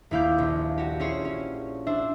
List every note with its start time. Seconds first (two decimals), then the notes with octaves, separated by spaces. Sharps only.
0.11 D#1 A#3 E4 F5 D6 G6
0.38 A#1
0.78 F#4 G4
1.00 C#4 E4 G#4 C5 C#5
1.25 C#4
1.87 D4 C5 E5